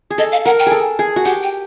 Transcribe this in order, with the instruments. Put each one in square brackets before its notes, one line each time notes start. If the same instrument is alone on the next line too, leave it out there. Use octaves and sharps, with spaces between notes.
[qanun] G#4
[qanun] A4 [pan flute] D#5
[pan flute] F5
[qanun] A#4 [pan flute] F#5
[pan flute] G5
[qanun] G#4 A4
G#4
F#4
[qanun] G4 [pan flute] F#5
[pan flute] G5